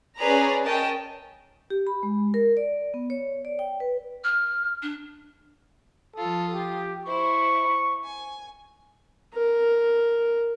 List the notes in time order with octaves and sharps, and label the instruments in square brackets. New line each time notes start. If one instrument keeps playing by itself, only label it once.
[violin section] C#4 G#4 B4 D5 A#5
C#4 A#4 D#5 G5 A5
[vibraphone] G4
B5
G#3
A#4
D5
B3
C#5
D5
G5
B4
[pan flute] F6
D4
[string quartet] F3 F4 D#6 [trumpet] A4
[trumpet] G4
[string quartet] E4 C5 [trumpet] C#6
[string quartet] G#5
[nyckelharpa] A#4